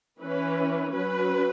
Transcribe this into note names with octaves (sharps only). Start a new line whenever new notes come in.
E3 C#4 B4
F#3 C#4 B4